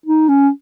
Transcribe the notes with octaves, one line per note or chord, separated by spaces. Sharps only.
D#4
C#4